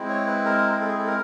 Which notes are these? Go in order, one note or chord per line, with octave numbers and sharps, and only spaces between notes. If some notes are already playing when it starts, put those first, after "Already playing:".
Already playing: G#3 C4 E4
C#5
B4
A#4
A#4
A4
G#4
A4
A#4